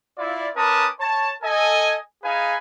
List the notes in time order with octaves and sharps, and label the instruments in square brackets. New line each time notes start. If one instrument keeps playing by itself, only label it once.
[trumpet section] E4 F4 D5
C#4 A#4 B4 A5 D6 D#6
C#5 A5
A4 D#5 G#5
D#4 G#4 B4 F5 G#5